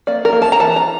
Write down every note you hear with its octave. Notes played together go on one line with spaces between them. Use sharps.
A#3 D5
A#4
A#3
A5
A#5
E3 A5
A#5